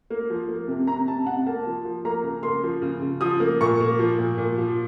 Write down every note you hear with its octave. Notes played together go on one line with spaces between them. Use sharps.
A#3
F3
A#3
C3
C3 A#5
C3 A5
C3 F#5
A#3 A5
F3
F3
A#3 A#5
C#3
A#3 C6
F3
C#3
C#3
F3 D#6
A#3
A#2 C#6
A#3
F3
A#2
A#2
F3